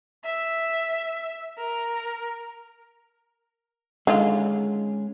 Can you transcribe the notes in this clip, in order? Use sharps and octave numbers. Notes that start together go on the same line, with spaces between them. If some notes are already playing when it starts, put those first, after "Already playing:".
E5
A#4
D3 D#3 G#3 C#4 F4 G#4